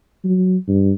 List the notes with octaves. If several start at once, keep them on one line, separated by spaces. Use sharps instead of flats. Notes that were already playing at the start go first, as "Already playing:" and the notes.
F#3
G2